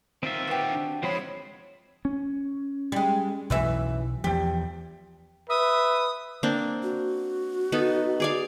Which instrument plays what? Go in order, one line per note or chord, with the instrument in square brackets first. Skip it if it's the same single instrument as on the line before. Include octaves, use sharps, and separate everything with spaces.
[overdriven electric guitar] D#3 F4 [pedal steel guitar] C4 E5
[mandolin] F#4 G4 [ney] B4
[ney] D4
[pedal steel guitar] F3 C4 B5 [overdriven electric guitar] G#3 C5 [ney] C#5
[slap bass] C#4
[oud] G3 G#3
[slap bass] B1 [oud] F#2 E3 E5
[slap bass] E2 F3 [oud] G4
[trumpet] B4 [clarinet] E5 [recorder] D#6
[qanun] A#3 C4 D4
[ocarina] F#4
[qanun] B3 D#4 A4
G#4 D5 F5